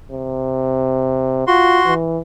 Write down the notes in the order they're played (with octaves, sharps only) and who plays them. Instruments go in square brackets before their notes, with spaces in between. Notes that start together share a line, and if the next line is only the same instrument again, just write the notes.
[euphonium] C3
[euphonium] F4 [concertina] F#4 C6
[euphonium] E3